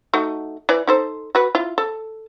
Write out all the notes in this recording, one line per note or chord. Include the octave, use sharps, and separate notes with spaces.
A3 D#4 F#4
E3 D5
D#4 A4 C5
F#4 B4
E4 F4
A4